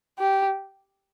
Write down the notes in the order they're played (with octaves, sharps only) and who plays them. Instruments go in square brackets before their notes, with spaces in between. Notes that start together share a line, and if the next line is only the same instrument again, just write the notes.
[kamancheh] G4